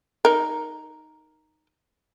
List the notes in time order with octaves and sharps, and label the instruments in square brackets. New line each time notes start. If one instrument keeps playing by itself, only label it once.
[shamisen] D#4 A#4